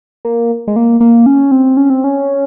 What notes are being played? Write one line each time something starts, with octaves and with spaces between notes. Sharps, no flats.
A#3
G#3
A#3
A#3
C#4
C4
C#4
C4
C#4